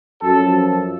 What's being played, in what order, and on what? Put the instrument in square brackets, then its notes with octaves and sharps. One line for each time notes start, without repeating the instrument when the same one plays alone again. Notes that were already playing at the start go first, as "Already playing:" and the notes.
[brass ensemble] F#2 F3 F#4 A4